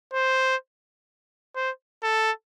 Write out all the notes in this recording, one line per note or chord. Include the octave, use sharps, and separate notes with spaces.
C5
C5
A4